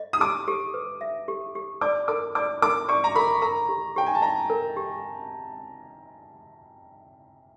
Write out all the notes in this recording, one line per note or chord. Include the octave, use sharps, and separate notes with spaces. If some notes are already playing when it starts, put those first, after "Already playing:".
Already playing: D#5
D#6
G4 D6
G4
B4
E5
G4
G4
D5 D6
A#4 D6
D5 D6
A#4 D6
D5 C#6
A#5
A#4 B5
A#4 A#5
G4
G4 G5
G#5
A5
D#5 A#5
A#4
G4